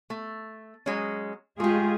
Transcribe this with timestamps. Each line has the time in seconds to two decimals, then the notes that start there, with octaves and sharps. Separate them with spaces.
0.10 A3
0.86 F#3 G#3 C#4
1.60 G#3 A3 F4 G4 G#4